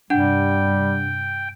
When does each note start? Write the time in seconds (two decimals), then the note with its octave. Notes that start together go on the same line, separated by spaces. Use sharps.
0.10 G2 C3 G3 D4 F#5 G5